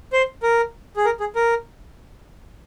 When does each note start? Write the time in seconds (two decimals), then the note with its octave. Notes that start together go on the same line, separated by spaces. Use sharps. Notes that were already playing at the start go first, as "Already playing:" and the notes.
0.13 C5
0.43 A#4
0.97 G#4
1.05 A#4
1.20 G#4
1.36 A#4